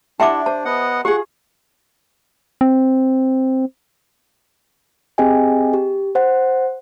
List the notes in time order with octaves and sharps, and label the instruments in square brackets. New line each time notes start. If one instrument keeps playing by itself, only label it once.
[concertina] D4 [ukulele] E4 F#5 A5 [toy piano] G4 E5 D6
[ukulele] C5 [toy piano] A5
[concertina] B3 D#5 F#5
[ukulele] F4 G#4 [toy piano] G4 [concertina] F#5 C#6
[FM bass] C4
[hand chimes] C4 G4 G#4 D#5 G5 G#5
G4
C5 F#5